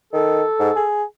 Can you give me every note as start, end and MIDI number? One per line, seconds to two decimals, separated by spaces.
0.13 0.43 51
0.13 0.84 69
0.60 0.71 44
0.76 1.04 68